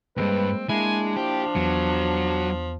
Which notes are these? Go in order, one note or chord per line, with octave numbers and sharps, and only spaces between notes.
D2 G2 G#3 A#3 C4 B4
G#3 A#3 D4 E4 G#5
F3 G4
E2 F#3 B3